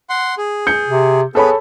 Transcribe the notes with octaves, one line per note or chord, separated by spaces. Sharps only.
F#5 C6
G#4
G6 C#7
C3
B3 G#4 A4 B4 C#5 B5